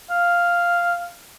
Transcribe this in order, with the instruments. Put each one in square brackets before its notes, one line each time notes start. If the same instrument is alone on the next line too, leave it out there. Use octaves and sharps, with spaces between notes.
[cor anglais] F5